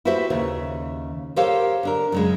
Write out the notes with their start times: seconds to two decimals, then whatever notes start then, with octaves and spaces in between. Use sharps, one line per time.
0.05 E4 F#4 G4 B4 C5 E5
0.30 D#2 C#3 E5
1.36 G4 A4 A#4 C5 C#5 F5
1.83 D3 D4 A#4
2.12 F#2 C#3 G#3